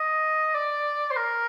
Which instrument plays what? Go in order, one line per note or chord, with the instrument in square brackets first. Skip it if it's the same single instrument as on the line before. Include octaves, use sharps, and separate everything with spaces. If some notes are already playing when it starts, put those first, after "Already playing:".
Already playing: [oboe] D#5
D5
C5
A#4